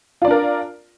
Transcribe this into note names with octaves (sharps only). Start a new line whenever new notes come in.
D4 F4 A#4 D5